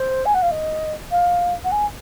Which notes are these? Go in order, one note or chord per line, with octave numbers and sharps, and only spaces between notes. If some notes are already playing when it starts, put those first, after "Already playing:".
Already playing: C5
G#5
F#5
F5
D#5
F5
F#5
G#5